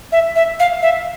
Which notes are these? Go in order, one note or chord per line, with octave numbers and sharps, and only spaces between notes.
E5
E5
F5
E5